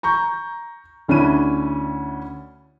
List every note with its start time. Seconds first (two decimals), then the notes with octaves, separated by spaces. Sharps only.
0.03 A#5 C#6 G6
1.08 D2 C#4 D4 E4 D#7